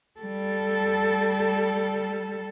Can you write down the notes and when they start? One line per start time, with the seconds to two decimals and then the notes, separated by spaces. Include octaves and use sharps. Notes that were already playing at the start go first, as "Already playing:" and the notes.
0.20 G3 A4